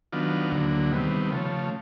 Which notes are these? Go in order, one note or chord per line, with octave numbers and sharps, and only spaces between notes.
D#3 F#3 B3 D4 F4
D2 D3 F#3 A#3
C3 D#3 G3 B3
C#3 F3 A3